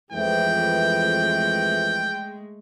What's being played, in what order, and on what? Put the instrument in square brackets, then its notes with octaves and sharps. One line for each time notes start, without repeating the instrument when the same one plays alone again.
[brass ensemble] F2 E3 [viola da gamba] G#3 A3 [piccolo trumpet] G5